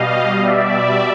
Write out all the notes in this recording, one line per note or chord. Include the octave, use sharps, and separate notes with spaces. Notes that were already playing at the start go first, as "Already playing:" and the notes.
Already playing: B2 G3 D#5 F5
D5 E5